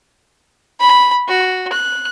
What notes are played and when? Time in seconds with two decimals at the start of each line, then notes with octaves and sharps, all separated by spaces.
0.80 B5
1.28 F#4
1.73 F#6